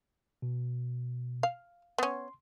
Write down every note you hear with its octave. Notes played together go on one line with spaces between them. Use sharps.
B2
F5
B3 C#4 C6